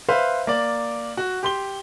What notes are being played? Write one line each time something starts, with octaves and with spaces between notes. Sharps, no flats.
B4 C5 E5 F5
A#3 D5
F#4
G4 C6 G7